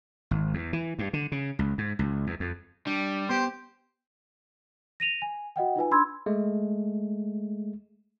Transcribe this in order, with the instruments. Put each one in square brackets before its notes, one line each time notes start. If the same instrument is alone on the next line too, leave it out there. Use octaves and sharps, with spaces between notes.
[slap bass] G#1
E2
E3
G2
D3
C#3
C#2
G#2
C#2
E2
F2
[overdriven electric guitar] G3 [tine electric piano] D4
[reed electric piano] B3 [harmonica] G4 C5 [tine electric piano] C6
[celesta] A#6 D#7 F7
G#5
F#4 D#5 F#5 G5
D#4 F4 B4 G#5
D4 B5 C6 E6 G#6
[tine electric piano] G#3 A3